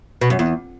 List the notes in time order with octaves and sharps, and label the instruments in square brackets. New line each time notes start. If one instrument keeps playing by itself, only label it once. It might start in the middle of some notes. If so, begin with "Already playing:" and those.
[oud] B2
F#2
E2